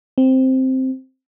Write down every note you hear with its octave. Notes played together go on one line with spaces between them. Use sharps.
C4